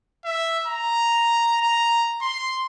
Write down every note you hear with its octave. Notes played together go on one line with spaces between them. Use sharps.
E5
A#5
A#5
C6